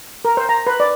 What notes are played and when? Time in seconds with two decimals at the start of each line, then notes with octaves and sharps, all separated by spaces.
0.25 A#4
0.37 C5
0.49 A#5
0.67 B4
0.80 D5